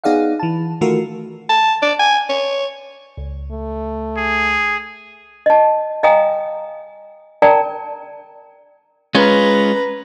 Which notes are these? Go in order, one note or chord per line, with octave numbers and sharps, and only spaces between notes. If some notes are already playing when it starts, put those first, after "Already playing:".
B3 D#4 G#4 D5 F5 F#5
E3 A5
D#3 E3 A3 F4 F#4 A#4
A5
D5
G#5
C#5
C#2
A3
G#4
D#5 A5
D#5 F5 G5 G#5 A#5 D#6
A#4 D5 G5 A5 A#5
G#3 C#4 F4 B4 A#5